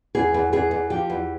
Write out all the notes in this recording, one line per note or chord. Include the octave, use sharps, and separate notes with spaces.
E2 G#4
E2
E2 G#4
E2
F3 G4
E2